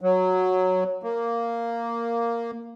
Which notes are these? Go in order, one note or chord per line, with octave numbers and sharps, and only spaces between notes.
F#3
A#3